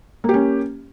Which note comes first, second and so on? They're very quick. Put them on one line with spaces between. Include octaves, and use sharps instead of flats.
A#3 G4 C#4